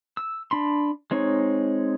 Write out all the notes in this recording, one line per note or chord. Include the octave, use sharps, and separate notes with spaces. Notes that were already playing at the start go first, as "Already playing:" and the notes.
E6
D4 B5 C6
G#3 C4 D#4 C#5